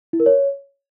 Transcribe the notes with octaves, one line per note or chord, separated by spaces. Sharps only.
E4
A#4
C#5